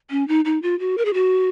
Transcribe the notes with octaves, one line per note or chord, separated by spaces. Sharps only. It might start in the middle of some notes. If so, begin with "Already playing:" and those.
C#4
D#4
D#4
F4
F#4
A#4
G#4
F#4